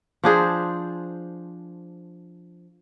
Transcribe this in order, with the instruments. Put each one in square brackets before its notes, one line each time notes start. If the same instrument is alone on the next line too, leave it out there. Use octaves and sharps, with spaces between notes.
[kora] F3 D4 G#4 C5